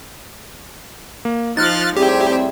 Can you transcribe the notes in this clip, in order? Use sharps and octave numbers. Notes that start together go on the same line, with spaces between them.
A#3
F3 D#4 F6 F#6 A6
A2 G3 C4 G4 G#4 E5